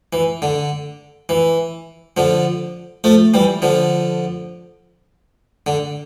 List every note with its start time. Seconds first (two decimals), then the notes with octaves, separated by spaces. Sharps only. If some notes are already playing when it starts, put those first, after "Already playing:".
0.13 E3
0.42 D3
1.29 E3
2.17 D3 F3
3.04 F3 A3
3.34 E3 G3
3.62 D3 F3
5.66 D3